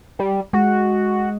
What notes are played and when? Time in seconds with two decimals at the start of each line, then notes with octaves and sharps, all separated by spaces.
0.19 G3
0.53 G#3 F#4